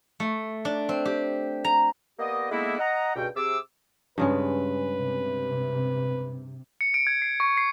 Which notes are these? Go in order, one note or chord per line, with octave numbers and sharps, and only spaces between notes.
A3
D4
C4
G4
A#5
A#3 B3 G4 D5 D#5
D3 G#3 A#3 B3 D#4 E4
D#5 F#5 A#5
C#2 G2 B2 F#4 G5
C3 G#4 D6 E6
G2 C#3 G#3 B4
C3
C#7
D7
G#6
C7
C#6
C7